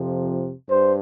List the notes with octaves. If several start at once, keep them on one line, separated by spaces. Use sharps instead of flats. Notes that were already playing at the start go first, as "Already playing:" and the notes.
Already playing: F2 C3 F3
G2 C5